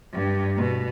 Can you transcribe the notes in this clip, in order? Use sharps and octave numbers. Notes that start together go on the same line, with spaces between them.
G2
B2